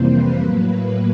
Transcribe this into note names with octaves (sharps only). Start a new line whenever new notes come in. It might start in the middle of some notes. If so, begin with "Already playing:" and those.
Already playing: F2 C3 E3 G3 A#3 C5
B4
A2 F#3 A#3 B4